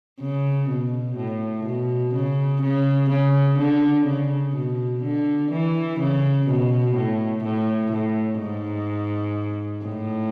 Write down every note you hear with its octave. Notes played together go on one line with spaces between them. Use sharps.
C#3
B2
A2
B2
C#3
C#3
C#3
D3
C#3
B2
D3
E3
C#3
B2
A2
A2
A2
G#2
A2